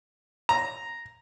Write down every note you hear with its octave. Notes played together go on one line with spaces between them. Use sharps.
A#5